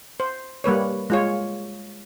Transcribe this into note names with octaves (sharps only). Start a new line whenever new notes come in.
C5
G3 A#3 B4 C#5
G#3 F4 C#5